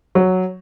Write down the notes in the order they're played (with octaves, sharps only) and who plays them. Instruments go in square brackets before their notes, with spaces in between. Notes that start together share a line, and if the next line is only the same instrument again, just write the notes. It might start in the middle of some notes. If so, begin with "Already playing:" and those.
[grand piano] F#3